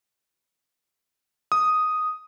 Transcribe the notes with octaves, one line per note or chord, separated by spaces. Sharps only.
D#6